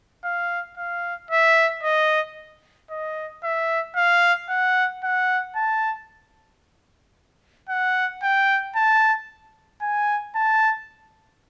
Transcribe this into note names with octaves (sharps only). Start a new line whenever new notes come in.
F5
F5
E5
D#5
D#5
E5
F5
F#5
F#5
A5
F#5
G5
A5
G#5
A5